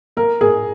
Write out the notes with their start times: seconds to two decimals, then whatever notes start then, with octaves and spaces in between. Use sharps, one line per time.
0.17 A#3 A#4
0.41 A#3 G#4